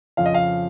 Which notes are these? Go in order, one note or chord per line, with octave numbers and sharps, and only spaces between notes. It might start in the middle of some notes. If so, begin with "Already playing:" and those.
F2 C#3 F3 F5
D#5
F5